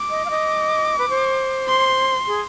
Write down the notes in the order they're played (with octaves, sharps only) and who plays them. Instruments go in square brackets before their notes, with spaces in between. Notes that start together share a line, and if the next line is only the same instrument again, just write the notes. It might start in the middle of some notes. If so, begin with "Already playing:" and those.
Already playing: [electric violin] D6
[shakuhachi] D#5
F5
D#5
B4
C5
[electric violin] C6
[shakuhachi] G#4